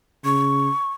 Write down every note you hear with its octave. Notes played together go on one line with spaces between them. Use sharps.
C#3 C#6